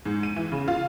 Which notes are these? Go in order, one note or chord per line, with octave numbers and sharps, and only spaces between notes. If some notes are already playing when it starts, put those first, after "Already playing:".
G#2
D#7
E3
C#3
F4